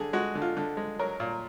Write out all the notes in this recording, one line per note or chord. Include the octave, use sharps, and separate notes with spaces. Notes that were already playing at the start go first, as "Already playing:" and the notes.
Already playing: D3 G#4
G#3 F#4
D3
F4
D3
G#3
F#3 A#4
A#2